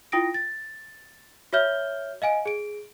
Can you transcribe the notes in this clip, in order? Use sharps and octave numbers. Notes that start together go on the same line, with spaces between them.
E4 F4 G5 D#6 A#6 D7
A6
F#4 C#5 E5 F6 G6 G7
D#5 F5 G#5 D7
G#4 D7